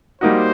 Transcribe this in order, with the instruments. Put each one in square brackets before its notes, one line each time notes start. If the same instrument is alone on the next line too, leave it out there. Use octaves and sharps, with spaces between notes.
[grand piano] G3 A#3 D#4 F#4 [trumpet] C5